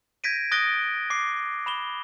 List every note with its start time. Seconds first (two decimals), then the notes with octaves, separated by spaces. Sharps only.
0.24 G6 G#6 A#6 B6 D7 D#7
0.52 D#6 F#6 A6 A#6 D7 G7
1.10 D6 C7
1.66 B5 E7 G7